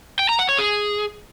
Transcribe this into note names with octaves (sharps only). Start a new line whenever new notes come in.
G5
A#5
F#5
C#5
G#4